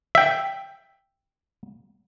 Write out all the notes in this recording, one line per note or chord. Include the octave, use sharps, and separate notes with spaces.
E5 G5